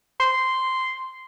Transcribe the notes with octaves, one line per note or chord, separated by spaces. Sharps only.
C6